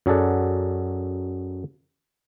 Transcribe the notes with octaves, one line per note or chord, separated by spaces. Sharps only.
F#2 F#3 G#4 A4 D5 F#5